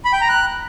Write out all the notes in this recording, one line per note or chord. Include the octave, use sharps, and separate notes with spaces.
B5
G5
A#5
F#6